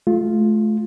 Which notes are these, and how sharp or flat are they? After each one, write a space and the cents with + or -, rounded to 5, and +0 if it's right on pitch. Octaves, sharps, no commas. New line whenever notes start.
A3 -40 F4 +0